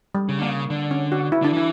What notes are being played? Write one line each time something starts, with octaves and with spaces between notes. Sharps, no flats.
G3
C#3
D3 A#3
C#3
D3
C#4
F#4
E4
D3 D4
E3 E4